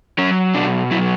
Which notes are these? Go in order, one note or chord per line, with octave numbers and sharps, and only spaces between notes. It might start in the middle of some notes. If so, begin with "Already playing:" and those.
F#3 C#4
B2 D4
F#3 E4